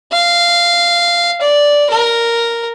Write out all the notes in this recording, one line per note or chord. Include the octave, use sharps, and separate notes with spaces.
F5
D5
A#4